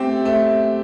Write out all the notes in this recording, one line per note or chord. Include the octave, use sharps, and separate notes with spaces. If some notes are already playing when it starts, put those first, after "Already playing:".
Already playing: A3 C4 G4
A3